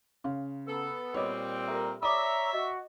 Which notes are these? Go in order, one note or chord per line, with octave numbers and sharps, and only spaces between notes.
C#3 F5 C6
B3 A4 B4 A#5
A#2 G3 C4 F#4 G#4 C#5 D#5
G4 A4 A#4 E5
C#5 D5 E5 A#5 B5 D6 D#6
F#4 D#5